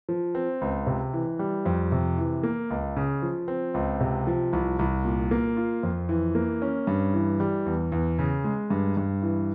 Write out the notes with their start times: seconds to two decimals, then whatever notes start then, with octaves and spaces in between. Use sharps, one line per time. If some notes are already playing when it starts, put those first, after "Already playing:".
0.09 F3
0.35 C4
0.61 C#2
0.87 C3
1.13 E3
1.39 G3
1.66 F2
1.92 C3
2.18 E3
2.43 A#3
2.70 C#2
2.96 C#3
3.22 F3
3.48 C4
3.74 C#2
4.01 C3
4.27 F3
4.53 C2
4.79 C2
5.05 A#2
5.31 A#3
5.57 F4
5.83 F2
6.09 E3
6.35 A#3
6.62 C#4
6.87 G2
7.14 E3
7.40 G3
7.66 E2
7.92 E2
8.19 C#3
8.44 G#3
8.70 G2
8.97 G2
9.22 E3